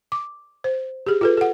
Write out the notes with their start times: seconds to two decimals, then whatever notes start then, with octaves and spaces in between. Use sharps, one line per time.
0.12 D6
0.64 C5
1.06 G4 G#4
1.21 F4 A4 B4
1.37 A4 F#5